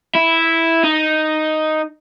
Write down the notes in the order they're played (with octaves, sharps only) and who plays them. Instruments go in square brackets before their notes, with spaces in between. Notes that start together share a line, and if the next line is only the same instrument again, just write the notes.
[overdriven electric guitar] E4
D#4